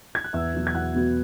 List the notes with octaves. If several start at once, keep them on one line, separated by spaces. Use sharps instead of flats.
G#6
F#6
E2 E5 E6
B2 F#3 B3
G#6
E2 F#5 F#6
B2 F#3 B3